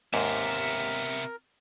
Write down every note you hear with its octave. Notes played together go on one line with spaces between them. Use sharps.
D#2 G#2 C3 B3 A#4 E5